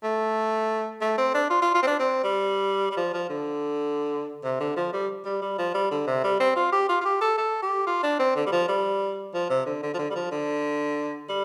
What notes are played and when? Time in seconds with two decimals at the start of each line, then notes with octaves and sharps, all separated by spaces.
0.03 A3
1.01 A3
1.18 C4
1.34 D4
1.50 F4
1.62 F4
1.75 F4
1.83 C4
1.87 D4
2.00 C4
2.24 G3
2.91 G3
2.97 F3
3.14 F3
3.30 D3
4.44 C3
4.60 D3
4.76 F3
4.93 G3
5.25 G3
5.42 G3
5.58 F3
5.74 G3
5.91 D3
6.07 C3
6.24 G3
6.40 C4
6.56 F4
6.72 G4
6.89 F4
7.01 F4
7.05 G4
7.21 A4
7.38 A4
7.62 G4
7.87 F4
8.03 D4
8.19 C4
8.36 D3
8.46 G3
8.52 F3
8.68 G3
9.34 F3
9.50 C3
9.66 D3
9.83 D3
9.94 F3
9.99 D3
10.11 G3
10.15 F3
10.32 D3
11.29 G3